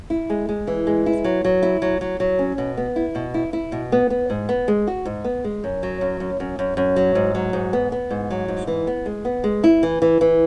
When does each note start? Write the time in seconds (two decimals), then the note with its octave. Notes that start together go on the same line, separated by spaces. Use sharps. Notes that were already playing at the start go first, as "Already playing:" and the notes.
0.10 E4
0.30 G#3
0.49 G#3
0.67 E3
0.87 G#3
1.06 E4
1.24 F#3
1.45 F#3
1.63 E4
1.82 F#3
2.01 F#3
2.20 F#3
2.39 C#4
2.58 B2
2.77 B3
2.96 E4
3.15 B2
3.34 E4
3.53 E4
3.72 B2
3.92 B3
4.10 B3
4.30 G#2
4.49 B3
4.68 G#3
4.87 F#4
5.05 G#2
5.25 B3
5.44 G#3
5.64 F#2
5.83 F#3
6.01 F#2
6.20 F#2
6.40 F#2
6.59 F#2
6.77 F#2
6.96 F#3
7.15 G#2
7.35 F#3
7.53 G#2
7.73 B3
7.92 B3
8.11 G#2
8.31 F#3
8.48 G#2
8.67 E3
8.87 B3
9.06 G#3
9.25 B3
9.44 G#3
9.64 E4
9.83 E3
10.02 E3
10.21 E3